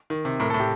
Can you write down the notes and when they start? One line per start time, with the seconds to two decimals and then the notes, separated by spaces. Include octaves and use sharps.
0.10 D#3
0.25 C3
0.40 A2 A#4
0.50 A4
0.54 A2
0.60 G4